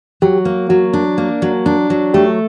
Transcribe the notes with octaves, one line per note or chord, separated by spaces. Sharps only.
F#3 G4
A#3
F#3 F#4
D4
A#3
F#3
D4
F#3
A3 G4